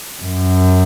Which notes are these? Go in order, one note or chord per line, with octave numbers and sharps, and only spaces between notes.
F#2